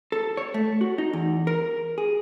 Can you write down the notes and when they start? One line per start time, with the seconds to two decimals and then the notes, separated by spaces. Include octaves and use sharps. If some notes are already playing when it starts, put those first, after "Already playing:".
0.12 A4
0.37 C#5
0.54 A3
0.81 F#4
0.98 D#4
1.13 E2
1.47 A#4
1.98 G#4